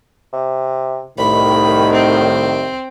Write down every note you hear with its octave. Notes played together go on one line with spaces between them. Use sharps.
C3
C2 A2 D#3 B5
C4